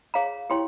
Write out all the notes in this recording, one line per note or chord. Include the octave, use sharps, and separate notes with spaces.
G#4 C#5 F5 A#5
E4 G4 C#5 G5 C6